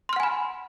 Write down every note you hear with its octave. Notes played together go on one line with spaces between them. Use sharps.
F#5 G#5 B5 C6 F6